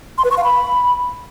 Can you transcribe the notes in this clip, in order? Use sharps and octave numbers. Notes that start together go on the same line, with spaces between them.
C6
B4
C#6
F5
B5